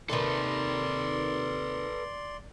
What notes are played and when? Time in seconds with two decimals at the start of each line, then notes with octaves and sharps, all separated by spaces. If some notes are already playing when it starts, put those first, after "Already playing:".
0.10 D#2 C3 D#3 A4 B4 D5 C6